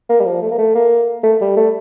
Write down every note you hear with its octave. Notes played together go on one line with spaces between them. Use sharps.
A#3
G3
F3
A3
A#3
A3
A#3
A3
G3
A3